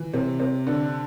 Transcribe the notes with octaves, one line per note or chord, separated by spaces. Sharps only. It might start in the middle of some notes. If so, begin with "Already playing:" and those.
Already playing: E3
C3
C3
D3